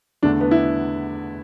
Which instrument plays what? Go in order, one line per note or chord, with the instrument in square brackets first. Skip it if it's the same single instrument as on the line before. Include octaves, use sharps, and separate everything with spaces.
[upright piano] E2 D3 A3 D4
B3
E4